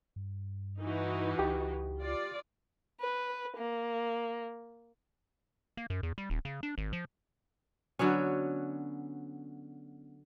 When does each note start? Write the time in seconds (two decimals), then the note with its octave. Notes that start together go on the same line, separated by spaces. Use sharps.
0.16 G2
0.81 E3 D#4 F#4
1.39 C#2 G4
1.99 F4 D5
3.00 B4
3.57 A#3
5.77 A#3
5.90 F#2
6.03 E2
6.18 G3
6.30 D#1
6.45 C#3
6.63 D4
6.78 G#1
6.93 F3
7.99 D3 F#3 B3 C#4